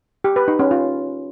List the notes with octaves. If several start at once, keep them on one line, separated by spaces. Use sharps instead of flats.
G4
B4
D#4
C#4
F4